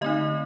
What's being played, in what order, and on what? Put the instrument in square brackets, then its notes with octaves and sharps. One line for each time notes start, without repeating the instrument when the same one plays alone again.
[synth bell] D3 A3 C4 D#4 D#5